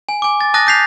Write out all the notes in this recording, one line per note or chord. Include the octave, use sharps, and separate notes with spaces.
G#5
G#5 D6
A6
A5 D#6 F#6 A6 A#6
D#6 G6 B6 C7 F7